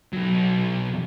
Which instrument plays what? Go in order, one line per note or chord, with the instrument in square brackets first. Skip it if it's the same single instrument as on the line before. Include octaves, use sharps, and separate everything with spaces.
[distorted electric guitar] B1 F#3